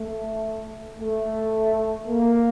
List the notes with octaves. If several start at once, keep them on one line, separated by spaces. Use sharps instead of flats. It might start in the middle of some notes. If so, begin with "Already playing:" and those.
Already playing: A3
A3
A#3